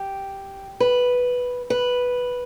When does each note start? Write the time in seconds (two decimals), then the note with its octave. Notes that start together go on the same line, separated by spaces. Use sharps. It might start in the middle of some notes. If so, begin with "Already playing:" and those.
Already playing: G4
0.80 B4
1.70 B4